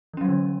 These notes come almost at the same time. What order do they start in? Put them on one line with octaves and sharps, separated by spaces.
E3 C#4 F#3 G3 D3